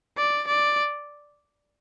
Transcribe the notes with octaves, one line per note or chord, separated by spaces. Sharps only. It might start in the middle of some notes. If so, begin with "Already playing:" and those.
D5
D5